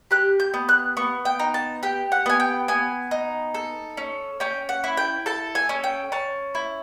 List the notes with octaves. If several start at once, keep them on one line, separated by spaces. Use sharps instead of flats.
G4 F#6
G6
B3
F#6
B3 C#6
G5
D#4
A5
G4 G5
F#5
B3 G#5
G5
B3 G#5
D#4
A4
C#4
C#4 G5
F#5
E4
G5
A4 A5
G#5
C#4
G5
C#4 A5
E4